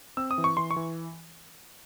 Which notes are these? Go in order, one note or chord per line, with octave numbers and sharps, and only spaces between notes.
C4 E6
D#6
E3
C#6
E3 C6
C#6
E3